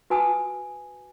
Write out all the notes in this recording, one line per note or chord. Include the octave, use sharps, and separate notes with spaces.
F#4 B4 G#5 A5 D#6